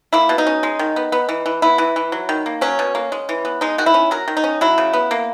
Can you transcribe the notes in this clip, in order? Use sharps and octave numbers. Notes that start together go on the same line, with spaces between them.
A#3 E4
B2
D#4
C#4
G#3
D#3
B3
B3
E3
E3
B3 E4
E3
E3
F#3
D#3
A#3
F#3 C#4
B2
A#3
G#3
E3
B3
G#3 D#4
D#3 F#4
E4
C#4
F#3 A#4
D#3
D#4
C#4
F#3 E4
C#3
B3
A#3